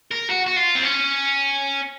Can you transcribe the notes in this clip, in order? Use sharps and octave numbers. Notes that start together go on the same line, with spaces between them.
A#4
F#4
F#4
F4
C4
C#4